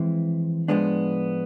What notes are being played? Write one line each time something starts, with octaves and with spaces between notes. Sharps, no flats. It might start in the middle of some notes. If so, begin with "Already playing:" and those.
Already playing: F2 E3 G#3 C4 E4
A2 F3 G#3 B3 D4